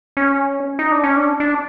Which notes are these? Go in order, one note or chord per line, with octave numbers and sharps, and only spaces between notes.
C#4
D#4
D4
C#4
D4
D4